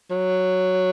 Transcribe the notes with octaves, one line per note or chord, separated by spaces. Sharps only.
F#3